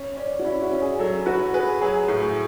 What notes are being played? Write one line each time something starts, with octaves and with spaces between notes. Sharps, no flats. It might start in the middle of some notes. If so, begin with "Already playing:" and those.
Already playing: C#4
C#4 D5
F#4
C#4 E4
F#4
C#4
G#4
F#3 A4
F#4 B4
G#4 B4
F#3 G#4
A2